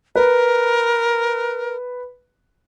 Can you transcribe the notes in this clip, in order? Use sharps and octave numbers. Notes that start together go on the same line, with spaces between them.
A#4 B4